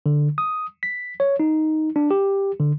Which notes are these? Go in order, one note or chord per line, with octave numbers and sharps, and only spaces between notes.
D3
D#6
B6
C#5
D#4
D4
G4
D3